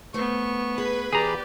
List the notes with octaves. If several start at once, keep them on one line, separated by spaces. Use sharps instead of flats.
A3 B3 C5 C#6
G#4 B4
E3 G4 G#4 D5 A#5